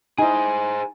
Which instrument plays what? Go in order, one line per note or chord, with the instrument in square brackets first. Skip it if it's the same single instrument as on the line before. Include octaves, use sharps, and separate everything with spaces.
[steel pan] D#4 E4 [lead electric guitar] G#4 C5 [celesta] G#5